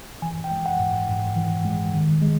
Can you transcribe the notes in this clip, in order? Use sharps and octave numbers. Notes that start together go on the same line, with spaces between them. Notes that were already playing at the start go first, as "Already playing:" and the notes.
E3 G#5
G5
G#3
F#5
G#2
G#2
E3
G#3
D#3
G#3